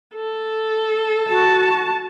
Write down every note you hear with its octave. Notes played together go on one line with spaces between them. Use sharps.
A4
F#4 A5